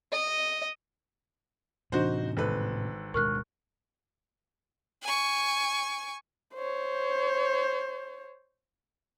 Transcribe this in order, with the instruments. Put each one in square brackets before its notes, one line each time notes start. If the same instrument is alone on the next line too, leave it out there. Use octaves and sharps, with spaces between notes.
[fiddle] D#5
[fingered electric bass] A2 C3 [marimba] E3 D4 [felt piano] D#4 F#4 C5
[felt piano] G#1 A4 B4
[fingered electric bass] D1 B2 G#3 [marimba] A#4 [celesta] C#6 F6 F#6
[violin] G#5 C#6
[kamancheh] C5 C#5